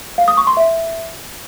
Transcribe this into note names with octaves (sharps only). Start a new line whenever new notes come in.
F5
D#6
C#6
C6
E5